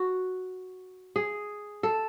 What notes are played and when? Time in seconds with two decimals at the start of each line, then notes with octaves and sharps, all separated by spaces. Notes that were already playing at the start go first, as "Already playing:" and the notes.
Already playing: F#4
1.16 G#4
1.83 A4